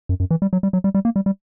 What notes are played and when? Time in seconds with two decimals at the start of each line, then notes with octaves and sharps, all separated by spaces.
0.09 F#2
0.20 F#2
0.31 E3
0.42 G3
0.53 F#3
0.63 G3
0.73 F#3
0.84 G3
0.95 G3
1.05 A#3
1.16 G3
1.26 G3